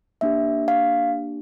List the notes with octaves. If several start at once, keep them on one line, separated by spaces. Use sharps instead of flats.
A#3 D4 G4 E5
F5